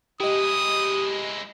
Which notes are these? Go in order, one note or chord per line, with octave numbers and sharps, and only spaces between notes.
G#3 E4 G4 D#5 D#6